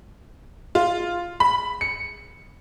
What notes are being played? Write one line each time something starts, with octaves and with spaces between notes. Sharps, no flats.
F4
B5
C#7